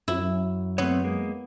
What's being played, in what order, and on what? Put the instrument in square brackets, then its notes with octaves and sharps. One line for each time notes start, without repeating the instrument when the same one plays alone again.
[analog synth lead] F#2 [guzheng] E4
[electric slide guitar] A3 C4 C#5 [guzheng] B3
[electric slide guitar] G#3 A#3